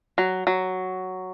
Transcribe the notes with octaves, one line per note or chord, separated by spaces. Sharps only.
F#3
F#3